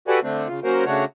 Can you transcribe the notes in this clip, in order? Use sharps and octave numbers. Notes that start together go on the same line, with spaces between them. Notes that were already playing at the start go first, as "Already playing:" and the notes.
F#4 G4 A4 B4 D5 G#5
D3 A3 C4 D4
C#3 F4
F#3 A#3 C#4 F#4 A#4 C5
C#3 A3 D4 F#4 C#5